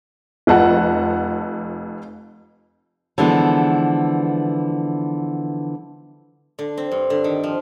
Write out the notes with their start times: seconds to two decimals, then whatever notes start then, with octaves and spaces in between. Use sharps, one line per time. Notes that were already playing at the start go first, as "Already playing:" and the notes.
0.47 F1 F2 F#5 A5
3.18 D3 E3 F3 G#3 B3
6.59 D3
6.77 C4
6.91 G2
7.10 D3
7.24 D#3
7.44 F3